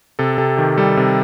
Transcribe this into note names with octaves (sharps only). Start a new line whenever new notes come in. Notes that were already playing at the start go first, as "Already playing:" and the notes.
C3 A4
C3 A4
D#3 G4
G3 A4
C3